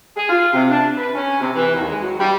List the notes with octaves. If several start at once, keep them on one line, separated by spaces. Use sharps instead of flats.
G#4
F4
C3
D4
B4
C#4
C3
E3
D#2
G#3
F#3
G3